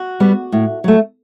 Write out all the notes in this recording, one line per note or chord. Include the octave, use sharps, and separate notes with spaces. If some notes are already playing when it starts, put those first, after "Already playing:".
Already playing: F#4
G3 B3
A2
F#3 A3